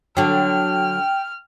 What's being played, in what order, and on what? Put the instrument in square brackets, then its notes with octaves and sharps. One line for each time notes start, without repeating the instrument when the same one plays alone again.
[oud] D3 F#3 [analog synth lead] G5 [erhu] F6